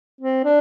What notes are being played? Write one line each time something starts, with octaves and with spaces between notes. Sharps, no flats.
C4
D4